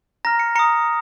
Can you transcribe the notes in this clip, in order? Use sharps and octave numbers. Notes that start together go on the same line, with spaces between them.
A#5 F6 A#6
C#7
A#5 D#6 C#7